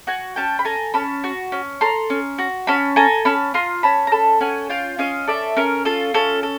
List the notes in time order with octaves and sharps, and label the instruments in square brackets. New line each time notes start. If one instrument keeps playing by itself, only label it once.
[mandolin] F#4 F#5 G#5
C#4 G5 A5
B5
A4 G#5 A#5
C#4 A5 B5
F#4
C#4
A4 A#5 C6
C#4
F#4
C#4 A5 B5
A4 G#5 A#5
C#4 A5 B5
F4 A#5 C6
C#4 A5 B5
A#5
A4 A5 B5
C#4 F#5 G#5
F4 F5 G5
C#4 D#5 F5
A4 D5 E5
C#4 A#4
F4 A4
C#4 A4
A4